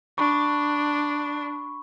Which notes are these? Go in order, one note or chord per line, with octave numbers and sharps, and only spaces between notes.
D4 B5 C#6